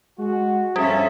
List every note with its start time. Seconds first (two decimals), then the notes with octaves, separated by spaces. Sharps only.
0.19 G#3 F#4
0.76 G2 F3 G3 C#4 A4 E5